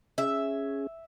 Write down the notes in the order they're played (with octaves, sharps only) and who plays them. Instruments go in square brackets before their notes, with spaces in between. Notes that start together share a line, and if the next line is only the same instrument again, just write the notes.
[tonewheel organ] C#4 G#4 [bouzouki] E5